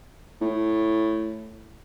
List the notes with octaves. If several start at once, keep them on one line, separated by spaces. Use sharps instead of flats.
A2